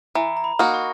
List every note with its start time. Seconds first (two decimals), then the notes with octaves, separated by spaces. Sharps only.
0.15 E3 A#5
0.37 A#5
0.44 B5
0.59 A#3 D#4 F#4
0.74 C#6